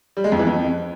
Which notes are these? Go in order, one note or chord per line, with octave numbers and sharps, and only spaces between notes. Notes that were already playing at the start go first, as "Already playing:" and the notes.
G3
G#3
F2
E3
F2